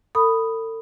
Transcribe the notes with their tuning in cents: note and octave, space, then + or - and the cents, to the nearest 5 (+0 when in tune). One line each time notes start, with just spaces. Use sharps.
A4 +40 B5 +0 D#6 +0